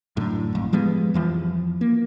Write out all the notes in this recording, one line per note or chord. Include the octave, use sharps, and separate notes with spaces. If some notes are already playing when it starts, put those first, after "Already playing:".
F#2 A2 D3
G#1 F2
F3 G3 G#3 B3
F2 E3 F3
A#3